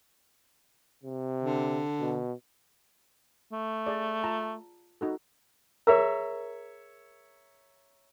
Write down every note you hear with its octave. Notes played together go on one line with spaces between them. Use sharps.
C3
D3
B2
A3
G#4 D5
F4 A5 A#5
D#4 F#4 A4
G#4 A#4 C#5 E5 A#5